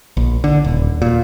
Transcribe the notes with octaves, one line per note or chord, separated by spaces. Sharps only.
A#1
D3
D#1
A#2